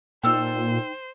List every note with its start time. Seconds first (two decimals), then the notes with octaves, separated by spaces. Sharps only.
0.23 A#2 D#4 A4 C5 G5 E6 F6